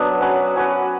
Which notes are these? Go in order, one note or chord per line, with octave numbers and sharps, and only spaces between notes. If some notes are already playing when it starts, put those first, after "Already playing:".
Already playing: F#3 B3 D4
C#4 F#4 B4
C#4 F#4 B4